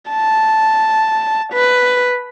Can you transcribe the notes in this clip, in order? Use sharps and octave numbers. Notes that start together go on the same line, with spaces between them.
A5
B4